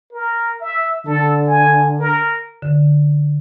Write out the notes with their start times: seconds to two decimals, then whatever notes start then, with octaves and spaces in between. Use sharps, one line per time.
0.13 A#4
0.61 E5
1.06 D3 A4
1.47 G#5
2.00 A#4
2.62 D3